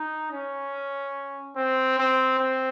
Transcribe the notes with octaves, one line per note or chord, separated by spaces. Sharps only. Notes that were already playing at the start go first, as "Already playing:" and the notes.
Already playing: D#4
C#4
C4
C4
C4